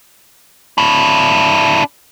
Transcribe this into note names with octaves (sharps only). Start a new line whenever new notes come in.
D4 E4